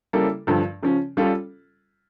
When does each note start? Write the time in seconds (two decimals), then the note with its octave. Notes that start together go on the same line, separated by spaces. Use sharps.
0.13 C#3 G3 A#3 E4 A4
0.47 G2 D3 F3
0.83 C#3 F3 C#4
1.17 G3 C#4 F4 A4